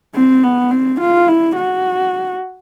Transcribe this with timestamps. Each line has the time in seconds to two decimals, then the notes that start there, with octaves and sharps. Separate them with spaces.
0.15 C4
0.43 B3
0.71 C4
1.00 F4
1.28 E4
1.57 F#4